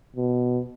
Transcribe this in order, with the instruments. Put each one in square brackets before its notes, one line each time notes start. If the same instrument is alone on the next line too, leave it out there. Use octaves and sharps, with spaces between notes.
[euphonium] B2